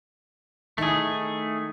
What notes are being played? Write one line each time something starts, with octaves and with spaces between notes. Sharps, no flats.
D#3 A3 D#4 E4 G#4